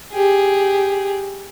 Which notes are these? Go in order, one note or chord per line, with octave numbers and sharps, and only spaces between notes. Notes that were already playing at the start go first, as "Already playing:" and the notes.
G4 G#4